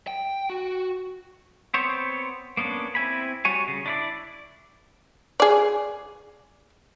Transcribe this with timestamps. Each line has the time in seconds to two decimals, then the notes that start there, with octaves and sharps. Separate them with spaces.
0.07 G5
0.50 F#4
1.74 B3 C4 C5 C#5
2.57 A#3 B3 C#4 D4
2.95 C4 E4 G#5 B5
3.45 G3 F#4 C#5 G#5
3.68 C#3
3.86 D4 E4 D5
5.40 G#4 D5